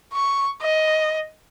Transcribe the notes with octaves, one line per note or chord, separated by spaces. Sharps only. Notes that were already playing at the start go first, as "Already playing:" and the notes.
C#6
D#5